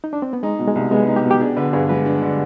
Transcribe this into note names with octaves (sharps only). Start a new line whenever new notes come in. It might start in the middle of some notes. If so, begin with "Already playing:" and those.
D#4
D4
C4
B3
G#3 D#4
B2
G#3
C2
G#3 B3
D#4
G4
B2
G4
D4 G#4
D3 B4
G2 G#4
G#3 B4
D4
D3